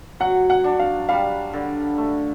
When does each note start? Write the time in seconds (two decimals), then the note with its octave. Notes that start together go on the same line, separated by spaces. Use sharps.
0.20 F#3 F#5
0.50 F#5
0.64 D4
0.79 F5
1.09 G3 F5
1.53 D3
1.98 A3